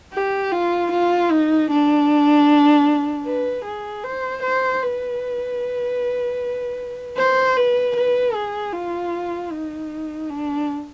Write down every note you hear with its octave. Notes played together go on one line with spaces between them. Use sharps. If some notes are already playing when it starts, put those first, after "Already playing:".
G4
F4
F4
D#4
D4
B4
G#4
C5
C5
B4
C5
B4
B4
G#4
F4
D#4
D4